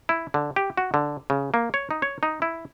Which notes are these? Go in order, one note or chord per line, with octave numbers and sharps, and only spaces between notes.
E4
D3
G4
F#4
D3
C#3
A#3
C#5
D#4
C#5
D#4
E4